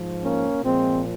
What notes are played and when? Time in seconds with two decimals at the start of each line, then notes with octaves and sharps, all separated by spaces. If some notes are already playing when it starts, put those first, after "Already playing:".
Already playing: G#2 F3
0.23 A#3 C#4
0.64 A#2 F3 G#3 C4